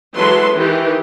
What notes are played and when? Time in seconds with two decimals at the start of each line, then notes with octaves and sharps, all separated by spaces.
0.16 E3 F#3 G#3 A4 B4 C6
0.53 D#3 E3 G4